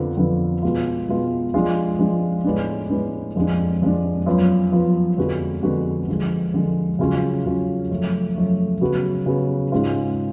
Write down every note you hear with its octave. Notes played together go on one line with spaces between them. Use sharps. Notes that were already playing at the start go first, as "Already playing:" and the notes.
Already playing: F2 D3 F3 B3 F4
F2 D3 F3 B3 F4
B2 G#3 B3 F4
B2 G#3 B3 F4
F3 G#3 D4 F4
F3 G#3 D4 F4
A2 G#3 B3 D4
A2 G#3 B3 D4
F2 F3 G#3 D4
F2 F3 G#3 D4
F#2 F3 B3 F4
F#2 F3 B3 F4
F2 D3 G#3 B3 F#4
F2 D3 G#3 B3 F#4
D3 F3 G#3
D3 F3 G#3
C#3 F#3 C#4 F4
C#3 F#3 C#4 F4
F#2 F3 A3
F#2 F3 A3
C#3 F#3 B3 F#4
C#3 F#3 B3 F#4
G#2 G#3 C#4 F4